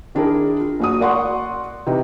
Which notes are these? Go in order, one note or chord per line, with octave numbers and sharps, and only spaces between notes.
D#3 D4 E4 G#4 A#4
F4
F#1 F#4 D#6
A#4 D5 F#5 C6 C#6
C3 E3 D#4 B4